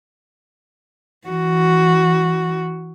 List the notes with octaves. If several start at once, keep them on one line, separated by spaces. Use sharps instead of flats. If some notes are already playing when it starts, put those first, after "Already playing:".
E3 F#4